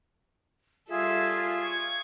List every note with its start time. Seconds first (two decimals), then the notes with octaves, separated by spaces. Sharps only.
0.89 G3 F4 G#4 A4 E5
1.61 C#6 G#6